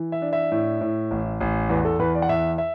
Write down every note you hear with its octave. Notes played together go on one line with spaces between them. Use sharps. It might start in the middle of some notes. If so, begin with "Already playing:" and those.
Already playing: E3
E5
D4
E5
A2
A2
A1
A1
E2 B4
A4
E2 B4
D5
F#5
E2 E5
E5